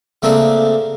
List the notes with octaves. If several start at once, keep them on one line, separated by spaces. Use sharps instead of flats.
C#3 A3 A#3 C4 D4